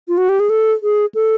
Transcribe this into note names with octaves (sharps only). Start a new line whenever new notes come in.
F4
F#4
G4
G#4
A4
G#4
A4